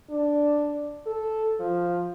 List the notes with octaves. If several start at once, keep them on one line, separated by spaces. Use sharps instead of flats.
D4
A4
F3